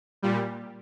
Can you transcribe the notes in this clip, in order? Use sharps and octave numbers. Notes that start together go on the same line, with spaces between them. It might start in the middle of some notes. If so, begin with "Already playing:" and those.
A#2 G3